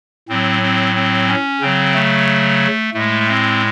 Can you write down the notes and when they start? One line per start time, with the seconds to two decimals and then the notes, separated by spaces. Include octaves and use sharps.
0.29 A2 F#3 C4
0.62 C4
0.95 C4
1.28 C#4
1.61 C#3 F#3 C4
1.95 A3
2.94 A2 G#3 A3
3.27 C4